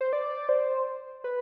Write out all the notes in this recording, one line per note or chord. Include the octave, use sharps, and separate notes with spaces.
C5
D5
C5
B4